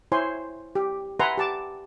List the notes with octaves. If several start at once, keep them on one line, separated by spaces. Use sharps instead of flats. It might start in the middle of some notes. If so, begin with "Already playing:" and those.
E4 C5 C#5 G#5 C6
G4
B4 E5 F#5 G#5 A#5 C6
G4 A5 D6